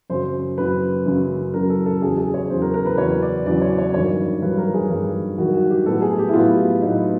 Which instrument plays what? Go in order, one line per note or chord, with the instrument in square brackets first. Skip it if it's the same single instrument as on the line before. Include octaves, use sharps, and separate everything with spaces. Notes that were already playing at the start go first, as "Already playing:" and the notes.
[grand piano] F#2 C#3 F#3 C5
F#2 C#3 F#3 B4
F#2 C#3 F#3
F#2 C#3 F#3 A#4
A4
A4
E2 C#3 F#3 G#4
G#4
C#5
E2 C#3 F#3 C5
A#4
A#4
B4
E2 C#3 F#3 C#5
D5
E2 C#3 F#3 D5
C#5
C#5
G2 D#3 F#3 C#5
G2 D#3 F#3 B4
A#4
G#4
G2 D#3 F#3
G2 D#3 F#3 F#4
F#4
G4
A2 F#3 B3 A4
G#4
G4
E4
A2 F#3 B3 F4
A2 F#3 B3 D#4